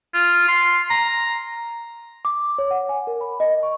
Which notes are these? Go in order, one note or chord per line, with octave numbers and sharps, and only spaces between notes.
F4
C6
A#5
D6
C#5
F#5
G#5
A#4
B5
D#5
C#6